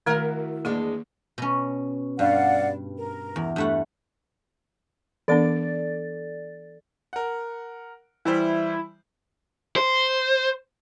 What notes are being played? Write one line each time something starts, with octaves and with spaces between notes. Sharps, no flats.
D#3 A3 E4 F#4 A#4
E2 G#3 A#3 D4
B2 C#4
G2 D5 F5 F#5
A#4
E2
G2 A3 F#5
E3 B3 D4 A4 D5 A6
A#4 F#5
E3 G3 E4 C5
C5